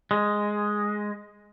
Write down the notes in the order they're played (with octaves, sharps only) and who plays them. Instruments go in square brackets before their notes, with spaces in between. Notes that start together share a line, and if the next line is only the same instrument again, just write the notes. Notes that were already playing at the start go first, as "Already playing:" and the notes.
[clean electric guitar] G#3